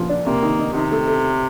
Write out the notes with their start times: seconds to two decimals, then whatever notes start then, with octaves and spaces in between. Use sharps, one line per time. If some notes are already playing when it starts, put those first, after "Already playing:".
Already playing: A#2 F3
0.09 D4
0.26 C3 A#3
0.43 D#3
0.59 D#4
0.75 C3 D#3
0.92 A3
1.08 A4